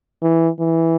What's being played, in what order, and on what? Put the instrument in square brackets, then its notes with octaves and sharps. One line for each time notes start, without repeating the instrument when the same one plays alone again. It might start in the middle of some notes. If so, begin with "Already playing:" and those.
[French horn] E3
E3